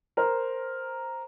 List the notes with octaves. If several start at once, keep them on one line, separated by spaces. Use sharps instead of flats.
A#4 C5